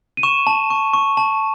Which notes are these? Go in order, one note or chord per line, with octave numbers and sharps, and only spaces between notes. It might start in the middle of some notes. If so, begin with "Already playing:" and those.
D#7
C#6 E7
A5
C#6
C#6
A5